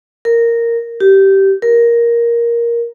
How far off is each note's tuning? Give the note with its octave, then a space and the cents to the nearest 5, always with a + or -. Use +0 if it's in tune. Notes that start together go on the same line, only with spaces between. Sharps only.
A#4 -5
G4 -15
A#4 +10